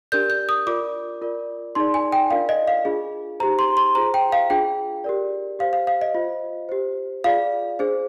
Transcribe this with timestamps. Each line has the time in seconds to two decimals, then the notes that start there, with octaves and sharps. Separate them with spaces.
0.12 D4 G4 A#4 D5 G6
0.30 G6
0.49 D#6
0.67 F4 A#4 D5 D6
1.21 F4 A#4 D5
1.75 D#4 G#4 D5 C6
1.94 G#5
2.12 G5
2.30 D4 F4 A#4 D5 F5
2.49 D#5
2.67 F5
2.85 D4 F4 G#4
3.40 C5 A#5
3.43 D#4 G4
3.59 C6
3.77 C6
3.95 F4 G#4 C5 A#5
4.14 G5
4.32 F5
4.50 D4 F4 G#4 G5
5.04 G4 A#4 D5
5.59 G4 C5 F5
5.73 F5
5.87 F5
6.01 D#5
6.15 F4 C5
6.69 G4 C5
7.24 F4 G#4 D5 F5
7.79 D4 G#4 C5